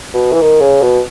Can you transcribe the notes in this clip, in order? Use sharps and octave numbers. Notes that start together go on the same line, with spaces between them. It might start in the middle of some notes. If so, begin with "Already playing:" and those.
B2
E3
D#3
C#3
B2